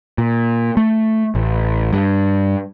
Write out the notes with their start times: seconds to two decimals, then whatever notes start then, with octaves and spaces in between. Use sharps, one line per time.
0.18 A#2
0.77 A3
1.35 A1
1.93 G2